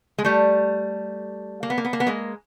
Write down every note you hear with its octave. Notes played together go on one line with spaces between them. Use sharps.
G#3
G3 A3
A#3
B3
A#3
B3
A#3
B3
G#3 A#3